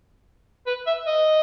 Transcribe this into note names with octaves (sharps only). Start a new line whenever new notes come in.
B4
E5
D#5